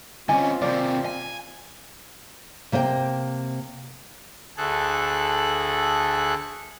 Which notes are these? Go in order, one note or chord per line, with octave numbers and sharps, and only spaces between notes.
D3 C4 C#4 F4 D#5 G#5
D#2 C3 D5
G#5
C3 A#3 C5 D5 G5
D2 G#4 A4 F#6